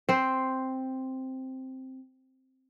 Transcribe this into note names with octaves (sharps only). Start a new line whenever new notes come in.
C4 C5